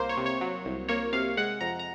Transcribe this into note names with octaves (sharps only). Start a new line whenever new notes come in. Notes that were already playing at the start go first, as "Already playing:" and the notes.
Already playing: C2 A#3 C5
C#5
C3
C#5
F#3
C2
A#3 C#5
C3 F5
G#3 F#5
F2 A#5
A#5